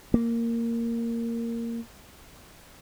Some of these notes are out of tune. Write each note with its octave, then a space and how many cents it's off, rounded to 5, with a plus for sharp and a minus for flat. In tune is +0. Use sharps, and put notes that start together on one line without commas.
A#3 -10